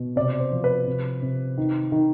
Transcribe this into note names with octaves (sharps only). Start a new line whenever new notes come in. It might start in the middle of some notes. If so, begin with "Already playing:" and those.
Already playing: B2
C3 D5
C5
F3
B4
C3
C3
D#3
D#3